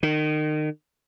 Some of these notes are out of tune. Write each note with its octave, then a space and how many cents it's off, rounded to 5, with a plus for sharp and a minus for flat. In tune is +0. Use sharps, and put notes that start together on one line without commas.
D#3 -30